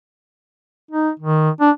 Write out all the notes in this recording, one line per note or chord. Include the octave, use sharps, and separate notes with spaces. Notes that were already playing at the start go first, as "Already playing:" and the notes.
D#4
D#3
D4